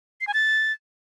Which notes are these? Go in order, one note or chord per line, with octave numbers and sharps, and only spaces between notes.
C7
G#5
A6